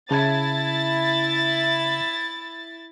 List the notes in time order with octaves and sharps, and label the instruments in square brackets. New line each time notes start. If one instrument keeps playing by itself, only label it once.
[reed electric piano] C#3 A5 G#6 [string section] E4 A6